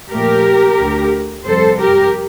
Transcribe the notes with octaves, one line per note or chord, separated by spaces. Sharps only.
A#2 F3 A3 G4 A#4
D2 D3 A3
F2 C3 G3 A4 C5
G4 A#4